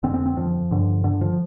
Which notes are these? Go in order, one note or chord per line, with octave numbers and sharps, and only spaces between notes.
F2 D3 C4
C4
C4
F3
G2 D3
D3
F3